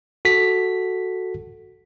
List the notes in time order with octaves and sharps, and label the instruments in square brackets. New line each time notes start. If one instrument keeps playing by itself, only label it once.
[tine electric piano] F#4 A4 B6